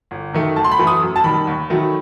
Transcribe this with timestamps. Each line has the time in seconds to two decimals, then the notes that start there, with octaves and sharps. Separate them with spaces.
0.11 G1
0.33 F#2 D#3 A3
0.56 G1 A5
0.64 C6
0.72 B5
0.79 F#2 E3 A3
0.87 D#6
1.02 F#2
1.16 A5
1.24 D#3 G3 B5
1.47 D#2
1.70 D#3 F#3 A3